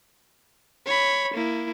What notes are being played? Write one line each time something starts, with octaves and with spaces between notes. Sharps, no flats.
C#5 B5
A#3 E4